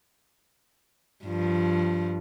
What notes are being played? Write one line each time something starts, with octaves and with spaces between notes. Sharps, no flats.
G2 F3